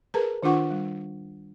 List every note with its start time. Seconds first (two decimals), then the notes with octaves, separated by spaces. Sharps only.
0.14 G#4 A#4 B4 A5 A#5
0.43 D#3 D4 F4 F#5 C#6
0.71 G3